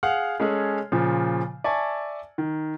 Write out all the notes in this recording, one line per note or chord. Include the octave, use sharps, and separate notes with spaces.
G#4 F5 F#5 F6
G#3 C#4 G#4 A4
A#2 C#3 F3
D5 E5 G#5 A5 C#6
D#3